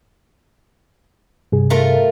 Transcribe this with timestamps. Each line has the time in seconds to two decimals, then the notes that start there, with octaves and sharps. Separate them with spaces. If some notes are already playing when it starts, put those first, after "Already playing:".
1.52 G2 C3 G#4
1.70 A3 F4 A#4